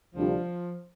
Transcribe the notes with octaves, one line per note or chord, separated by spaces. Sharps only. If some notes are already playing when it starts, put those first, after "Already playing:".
D2 C3 F3 G3 D4 F4